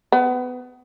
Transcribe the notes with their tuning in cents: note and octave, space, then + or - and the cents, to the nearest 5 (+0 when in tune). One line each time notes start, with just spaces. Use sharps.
B3 +25